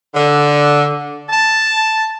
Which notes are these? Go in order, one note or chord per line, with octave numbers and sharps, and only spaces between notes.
D3
A5